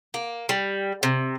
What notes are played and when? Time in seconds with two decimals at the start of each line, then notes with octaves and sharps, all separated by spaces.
0.14 A#3
0.49 G3
1.03 C3